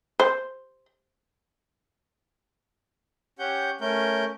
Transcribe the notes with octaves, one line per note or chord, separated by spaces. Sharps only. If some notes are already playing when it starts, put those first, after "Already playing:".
C5
C#4 G4 F#5 G6
A3 C#4 A#4 G6